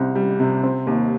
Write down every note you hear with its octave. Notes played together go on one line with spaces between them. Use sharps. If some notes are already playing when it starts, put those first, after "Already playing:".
Already playing: C2 C4
G3
C3
C4
D#2